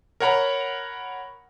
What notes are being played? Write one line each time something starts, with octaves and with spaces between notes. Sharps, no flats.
A#4 C#5 F#5 A#5 B5